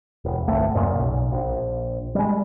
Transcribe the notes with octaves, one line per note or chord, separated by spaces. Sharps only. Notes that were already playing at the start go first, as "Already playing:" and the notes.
E1
G1 C2 A3
D#1 F#2 A#2 C#3
B1
A#1
G3 G#3